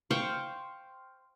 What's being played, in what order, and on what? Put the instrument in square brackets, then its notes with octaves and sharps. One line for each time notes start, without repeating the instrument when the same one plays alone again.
[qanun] C5 F5 G5 C#6